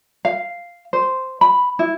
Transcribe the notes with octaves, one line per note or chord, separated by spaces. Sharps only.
F5
C5
B5
E4